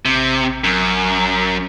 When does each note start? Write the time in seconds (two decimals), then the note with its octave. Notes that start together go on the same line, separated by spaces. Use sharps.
0.05 A1 C3
0.64 F#2